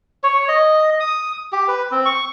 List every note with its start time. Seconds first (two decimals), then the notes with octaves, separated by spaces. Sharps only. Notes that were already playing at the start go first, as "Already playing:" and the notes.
0.24 C#5
0.48 D#5
1.00 D#6
1.52 G4
1.68 B4
1.92 C4
2.05 C#6